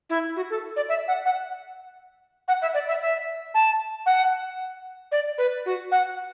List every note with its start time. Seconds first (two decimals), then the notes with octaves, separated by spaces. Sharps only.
0.10 E4
0.36 F#4
0.50 A4
0.76 D5
0.89 E5
1.08 F#5
1.25 F#5
2.48 F#5
2.62 E5
2.74 D5
2.88 E5
3.02 E5
3.54 A5
4.06 F#5
5.12 D5
5.38 B4
5.66 F#4
5.92 F#5